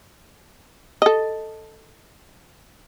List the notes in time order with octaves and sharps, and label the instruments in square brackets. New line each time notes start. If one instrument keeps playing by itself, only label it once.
[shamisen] A4 D#5